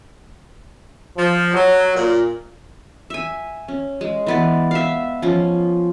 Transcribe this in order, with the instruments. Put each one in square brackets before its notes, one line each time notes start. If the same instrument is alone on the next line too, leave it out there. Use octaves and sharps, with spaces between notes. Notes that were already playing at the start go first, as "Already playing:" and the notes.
[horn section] F3
F#3
A#2
[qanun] E5 G#5
C#4
G#3
E3 B3 D5
E5 F5
F3 C#4 F4